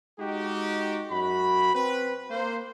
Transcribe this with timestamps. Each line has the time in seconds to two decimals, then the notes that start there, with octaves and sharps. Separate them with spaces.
0.19 G#3 D#4 F#4 G4
1.11 F#2 F#4 B5
1.75 C4 B4
2.30 A#3 C5